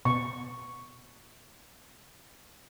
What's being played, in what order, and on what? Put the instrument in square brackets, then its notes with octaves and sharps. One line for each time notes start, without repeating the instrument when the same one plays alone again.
[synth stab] B2 [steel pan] C#6